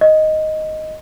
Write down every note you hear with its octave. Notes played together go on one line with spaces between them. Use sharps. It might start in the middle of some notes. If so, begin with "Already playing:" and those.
D#5